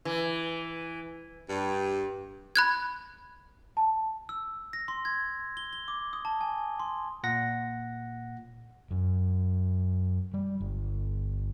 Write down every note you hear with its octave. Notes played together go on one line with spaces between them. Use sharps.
E3
G2
B5 F#6 G#6
A5
E6
A#6
C6
G#6
G7
G7
D6
D#6
A5
G#5
C6
A#2 F#5 A#6
F#2
G3
G1